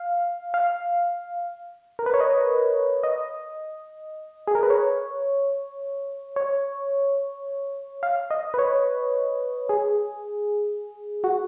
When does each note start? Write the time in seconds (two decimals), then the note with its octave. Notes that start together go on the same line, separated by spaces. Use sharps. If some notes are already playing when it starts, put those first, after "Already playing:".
Already playing: F5
0.54 F5
1.99 A#4
2.06 B4
2.14 C#5
2.20 D#5
3.03 D#5
4.48 G#4
4.55 A#4
4.63 B4
4.70 C#5
6.36 C#5
8.03 F5
8.31 D#5
8.54 B4
8.58 C#5
9.69 G#4
11.24 F#4